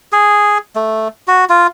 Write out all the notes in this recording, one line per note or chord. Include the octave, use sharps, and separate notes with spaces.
G#4
A3
F#4
F4